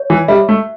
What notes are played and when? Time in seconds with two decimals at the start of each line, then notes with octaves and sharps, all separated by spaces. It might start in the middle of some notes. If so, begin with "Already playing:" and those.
Already playing: C#5
0.10 E3
0.28 G3 E5
0.49 A3